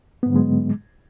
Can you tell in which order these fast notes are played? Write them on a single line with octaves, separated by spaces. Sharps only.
B3 G#2 D3 F#3 G#3